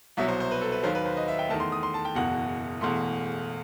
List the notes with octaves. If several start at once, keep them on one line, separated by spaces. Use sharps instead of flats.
C2 B2 F#3 E5
C5
C5
B4
A4
B4
D#2 D#3 F#3 C5
B4
C5
D#5
E5
G5
E2 D#3 A3 A5
C6
D#6
C6
A5
G5
F#1 E2 B2 F#5
E1 E2 B2 A3 C6